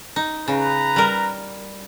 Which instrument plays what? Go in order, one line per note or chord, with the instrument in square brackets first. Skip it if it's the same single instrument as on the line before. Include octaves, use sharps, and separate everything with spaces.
[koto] D#4
[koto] C#3 [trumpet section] B4 A#5
[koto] G3 A#4